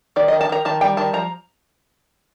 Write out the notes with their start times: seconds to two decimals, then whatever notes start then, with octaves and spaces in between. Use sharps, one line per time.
0.16 D#3 D5
0.28 D#3 D#5
0.41 A5
0.49 D#3 A#5
0.65 D#3 A5
0.81 G3 G5
0.97 D#3 A5
1.13 F3 A#5